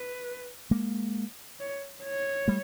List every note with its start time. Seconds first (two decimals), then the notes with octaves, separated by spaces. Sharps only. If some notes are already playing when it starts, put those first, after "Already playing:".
Already playing: B4
0.71 G#3 A#3
1.60 C#5
2.04 C#5
2.48 G3 A3